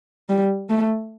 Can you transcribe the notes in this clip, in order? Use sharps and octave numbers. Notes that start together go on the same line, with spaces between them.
G3
A3